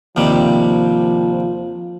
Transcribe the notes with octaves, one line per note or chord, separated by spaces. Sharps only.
D#2 C3 F3 G3